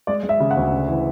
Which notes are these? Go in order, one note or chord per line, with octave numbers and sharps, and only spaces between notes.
G#3 D5
G#3
E5
C#3
F#5
D2
C#3
E3